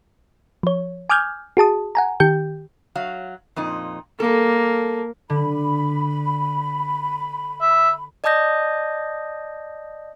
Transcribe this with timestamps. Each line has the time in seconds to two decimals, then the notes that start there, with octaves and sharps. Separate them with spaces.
0.63 F3 C#5
1.10 G#5 D6 D#6 F6 G6 G#6
1.57 F#4 G#4 A5 D#6
1.95 F#5 G#5 A#5
2.20 D#3 G4 G5 G6
2.95 F#3 F5
3.56 F2 A#2 D#4
4.20 G3 A#3 A4
5.30 D3 B5
7.61 E5
8.24 D5 D#5 A5 D#6 G6 A#6